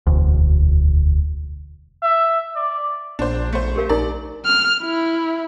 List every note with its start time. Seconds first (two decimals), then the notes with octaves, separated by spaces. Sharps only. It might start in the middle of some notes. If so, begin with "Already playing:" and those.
0.07 E1 D2
2.03 E5
2.56 D5
3.19 A#1 D4 C5
3.53 A#1 A3 C5
3.76 G4 A#4 F5
3.89 A#1 D#4 A#4 D5 A#5
4.46 F6
4.84 E4